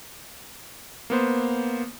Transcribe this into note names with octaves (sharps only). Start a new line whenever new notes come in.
A#3 B3 C5